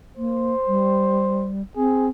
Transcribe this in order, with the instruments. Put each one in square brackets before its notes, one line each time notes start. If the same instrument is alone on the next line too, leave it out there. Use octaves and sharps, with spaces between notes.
[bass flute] A#3 [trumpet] C5
[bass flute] G3
[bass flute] C4 [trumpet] G#4